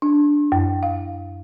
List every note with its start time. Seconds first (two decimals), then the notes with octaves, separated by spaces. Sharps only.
0.02 D4
0.52 F#2
0.83 F5